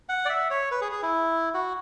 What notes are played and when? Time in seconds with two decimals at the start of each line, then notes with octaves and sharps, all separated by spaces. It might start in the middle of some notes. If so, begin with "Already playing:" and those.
0.09 F#5
0.25 D5
0.29 E5
0.50 C#5
0.71 B4
0.82 G#4
0.92 G#4
1.02 E4
1.54 F#4